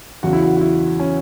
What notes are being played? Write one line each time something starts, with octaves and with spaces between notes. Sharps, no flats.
E2 C#3 F#3 F#4
E4
F#4
F#4
E4
C#4